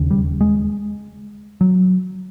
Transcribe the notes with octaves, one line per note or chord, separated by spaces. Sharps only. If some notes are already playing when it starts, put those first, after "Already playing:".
Already playing: E1 D#2 C#3
G3
G#3
F#3